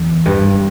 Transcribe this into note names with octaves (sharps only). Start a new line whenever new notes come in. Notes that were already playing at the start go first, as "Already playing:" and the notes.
Already playing: E2
G2